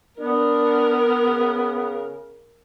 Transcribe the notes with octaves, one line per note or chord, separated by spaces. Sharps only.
B3 D4 A#4
C#3